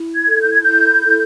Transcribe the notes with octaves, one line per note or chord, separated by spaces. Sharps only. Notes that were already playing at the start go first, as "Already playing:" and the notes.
Already playing: E4
G#6
A4
G6
G#6
E4 G6
A4